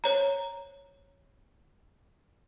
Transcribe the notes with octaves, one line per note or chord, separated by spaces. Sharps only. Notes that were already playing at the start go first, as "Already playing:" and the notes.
C5 C#5 A#5